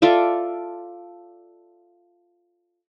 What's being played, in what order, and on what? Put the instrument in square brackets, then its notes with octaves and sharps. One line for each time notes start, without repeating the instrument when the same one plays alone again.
[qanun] F4 A4 D5 E5